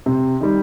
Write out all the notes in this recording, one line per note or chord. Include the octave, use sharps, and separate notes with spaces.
C3
D#3 G3